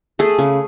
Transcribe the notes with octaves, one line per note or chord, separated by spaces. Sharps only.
A3 G#4
C#3